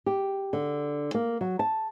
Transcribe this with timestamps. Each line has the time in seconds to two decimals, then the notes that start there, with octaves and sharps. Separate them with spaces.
0.06 G4
0.53 D3
1.14 A#3
1.41 F#3
1.59 A5